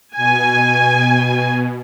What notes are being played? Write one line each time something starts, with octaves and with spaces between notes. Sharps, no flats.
B2 G#5